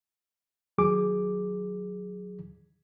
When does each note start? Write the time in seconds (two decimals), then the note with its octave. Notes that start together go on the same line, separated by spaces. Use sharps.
0.78 D#2 F#3 G#4 D6